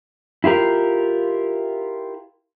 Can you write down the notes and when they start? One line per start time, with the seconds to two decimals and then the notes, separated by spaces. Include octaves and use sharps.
0.44 E4 F4 G4 A#4